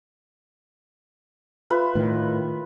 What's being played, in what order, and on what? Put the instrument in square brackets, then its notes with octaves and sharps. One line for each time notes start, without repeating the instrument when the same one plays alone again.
[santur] F4 B4 E5
[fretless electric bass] A2 D#3